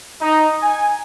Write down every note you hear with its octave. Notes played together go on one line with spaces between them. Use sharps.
D#4
G#5